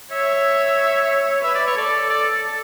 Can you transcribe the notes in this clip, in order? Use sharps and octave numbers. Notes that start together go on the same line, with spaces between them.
C#5 E5
B4 E5
D5
C#5
A4 D5
D5